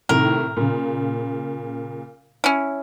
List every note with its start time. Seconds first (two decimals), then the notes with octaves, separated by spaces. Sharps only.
0.09 A2 C3 D#3 A#4
0.57 A#2 C#3
2.44 C#4 E4